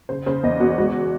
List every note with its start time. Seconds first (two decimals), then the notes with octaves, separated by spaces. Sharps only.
0.09 C#3 C5
0.26 C#3 C5
0.43 E2 D#5
0.60 E2 F#4
0.78 G#3 F#4